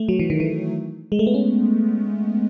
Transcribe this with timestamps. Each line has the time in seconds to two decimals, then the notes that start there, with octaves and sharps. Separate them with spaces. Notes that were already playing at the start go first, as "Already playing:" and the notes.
Already playing: A3
0.09 F#3
0.19 E3
0.30 D#3
0.40 E3
1.12 G#3
1.19 A3
1.27 B3
1.34 C#4